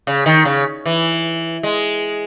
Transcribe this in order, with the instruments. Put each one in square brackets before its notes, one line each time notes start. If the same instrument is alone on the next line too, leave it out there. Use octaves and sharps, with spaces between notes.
[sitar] C#3
D#3
C#3
E3
G#3